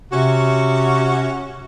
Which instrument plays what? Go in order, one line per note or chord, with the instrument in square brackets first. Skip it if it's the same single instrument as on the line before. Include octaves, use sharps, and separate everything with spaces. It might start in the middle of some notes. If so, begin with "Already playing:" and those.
[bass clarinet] C3 [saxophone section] C#4 F#4